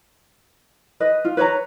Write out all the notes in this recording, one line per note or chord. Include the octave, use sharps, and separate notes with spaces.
B4 D#5
F4
B4 C#5 D#5 A#5